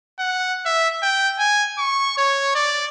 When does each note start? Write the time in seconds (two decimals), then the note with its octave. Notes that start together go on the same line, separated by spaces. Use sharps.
0.19 F#5
0.66 E5
1.03 G5
1.39 G#5
1.78 C#6
2.18 C#5
2.55 D5